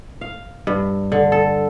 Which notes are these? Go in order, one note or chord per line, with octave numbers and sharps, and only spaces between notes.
F5
G2
D3
A4